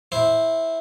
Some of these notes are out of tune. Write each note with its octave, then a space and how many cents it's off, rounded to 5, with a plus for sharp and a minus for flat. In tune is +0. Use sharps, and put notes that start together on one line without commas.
E4 -10 C5 +0